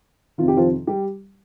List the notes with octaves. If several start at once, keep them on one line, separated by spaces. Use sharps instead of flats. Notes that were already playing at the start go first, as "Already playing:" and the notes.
F2 C3 D#3 F4
G4
F3 F4
G3 G4